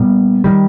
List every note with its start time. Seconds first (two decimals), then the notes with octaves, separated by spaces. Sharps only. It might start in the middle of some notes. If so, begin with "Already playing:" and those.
Already playing: A#2 G3 B3
0.44 D#3 G3